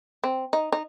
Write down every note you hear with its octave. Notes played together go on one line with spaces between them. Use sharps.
C4
D#4
D#4